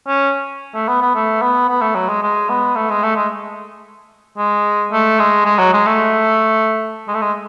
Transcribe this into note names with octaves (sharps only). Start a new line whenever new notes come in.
C#4
A3
B3
B3
A3
B3
B3
A3
F#3
G#3
G#3
B3
A3
G#3
A3
G#3
G#3
A3
G#3
G#3
F#3
G#3
A3
G#3
A3
G#3